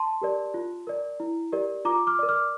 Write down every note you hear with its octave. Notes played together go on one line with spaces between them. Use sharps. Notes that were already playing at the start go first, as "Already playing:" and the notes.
Already playing: A5 C6
G4 A#4 D5
F4
A#4 D5
E4
G4 A#4 D5
F4 A#5 D6
D6 F6
A#4 D5
D6 F6